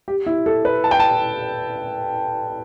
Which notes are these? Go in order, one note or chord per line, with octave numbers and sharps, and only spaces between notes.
G4
E4
A4
B4
A5
G5
A5